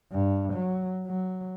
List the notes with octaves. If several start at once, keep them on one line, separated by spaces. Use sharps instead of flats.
G2
F#3
F#3